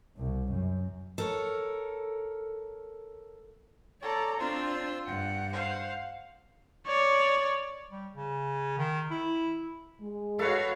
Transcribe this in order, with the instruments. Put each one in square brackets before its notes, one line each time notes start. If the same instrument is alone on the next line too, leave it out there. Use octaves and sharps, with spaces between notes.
[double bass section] C2
F#2
[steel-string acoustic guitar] A4 A#4 C#5
[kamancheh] A4 [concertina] C#5 [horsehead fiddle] D5 A#5
[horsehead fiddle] C4 [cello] D4 [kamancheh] F4 [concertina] C5 C6 E6
[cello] G2 [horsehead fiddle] F#5 [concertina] G5
[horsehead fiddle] C5 [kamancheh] F5 F#5
[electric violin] C#5 D5
[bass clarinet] G3
C#3
D#3
E4
[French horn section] G#3
[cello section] F#4 C#5 F5 [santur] A4 B4